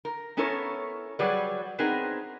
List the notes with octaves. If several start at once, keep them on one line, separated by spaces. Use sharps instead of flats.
A#4
B3 C#4 E4 A4 A#4 C#5
F#3 G3 G#4 B4 D5
B3 C4 D#4 G#4 A#4 B4